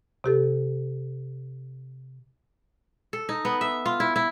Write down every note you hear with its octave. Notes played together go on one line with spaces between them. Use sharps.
C3 G4 A4
A4
D#4
B3
E5
F4
E4
E4